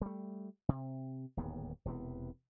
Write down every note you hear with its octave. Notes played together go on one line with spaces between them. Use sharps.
G3 A3
C3
D1 D#2 G#2 B3
E1 C3 E3 B3